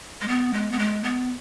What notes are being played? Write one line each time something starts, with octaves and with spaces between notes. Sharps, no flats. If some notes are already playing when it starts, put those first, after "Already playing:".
G#3
B3
G#3
B3
G#3
B3